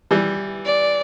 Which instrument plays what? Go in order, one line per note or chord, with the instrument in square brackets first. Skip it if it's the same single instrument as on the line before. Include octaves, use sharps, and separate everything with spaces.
[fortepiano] E3 G3
[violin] D5